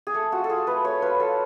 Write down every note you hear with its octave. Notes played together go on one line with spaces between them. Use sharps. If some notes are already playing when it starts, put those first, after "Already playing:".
G#4
A3 A4
F4 F#4
A4
F4 G#4
A3 B4
A3 C#5
F4 B4
F4 A4